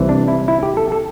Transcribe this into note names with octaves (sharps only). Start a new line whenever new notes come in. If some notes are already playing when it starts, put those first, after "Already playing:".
Already playing: C2 C3 E3
D4
E4
E4
G4
A4
A4